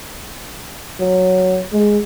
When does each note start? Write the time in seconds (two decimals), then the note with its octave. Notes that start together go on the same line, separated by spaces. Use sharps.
1.00 F#3
1.73 G#3